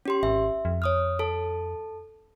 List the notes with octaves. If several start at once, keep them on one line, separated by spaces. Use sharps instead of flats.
C#4 G4 C6
G#1 E5
F2
C#5 D#6 F6
A4 A5